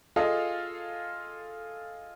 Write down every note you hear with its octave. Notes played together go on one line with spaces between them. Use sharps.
F4 G#4 A4 D#5 F5